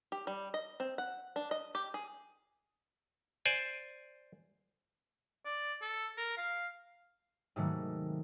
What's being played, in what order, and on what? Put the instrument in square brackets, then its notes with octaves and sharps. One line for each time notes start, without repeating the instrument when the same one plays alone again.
[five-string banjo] G4
G3
D#5
C4
F#5
D4
D#5
G4
G#4
[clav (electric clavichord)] C5 D5 G#5
[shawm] D5
A4
A#4
F5
[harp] G#2 C3 D#3 F#3 G#3 A3